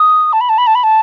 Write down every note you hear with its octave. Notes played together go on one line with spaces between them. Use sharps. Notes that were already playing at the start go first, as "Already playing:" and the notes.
Already playing: D#6
A5
B5
A5
B5
A5
B5
A5